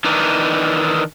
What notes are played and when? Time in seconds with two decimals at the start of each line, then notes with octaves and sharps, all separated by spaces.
0.04 D#3 E3 D4 D#4